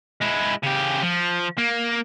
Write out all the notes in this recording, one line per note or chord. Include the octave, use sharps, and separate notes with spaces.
G#3 E4
C#3 G4
F3
A#3